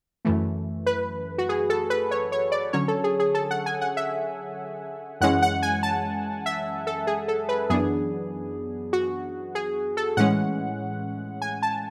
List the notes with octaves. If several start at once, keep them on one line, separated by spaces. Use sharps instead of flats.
F#2 E3 A3
B4
F#4
G#4
A4
B4
C#5
C#5
D5
D3 F#3 C#4 C#5
A4
G#4
G#4
A4
F#5
G#5
F#5
E5
F#2 E3 G#3 C#4 F#5
F#5
G#5
A5
E5
A4
G#4
A4
B4
F#2 E3 B3 D4 G#4
F#4
G#4
A4
A2 E3 G#3 C#4 F#5
G#5
A5